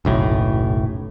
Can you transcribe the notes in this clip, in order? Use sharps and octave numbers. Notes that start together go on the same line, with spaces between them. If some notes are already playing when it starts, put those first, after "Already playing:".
F#1 B1 A2